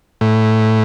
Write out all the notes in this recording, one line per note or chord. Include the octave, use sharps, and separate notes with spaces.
A2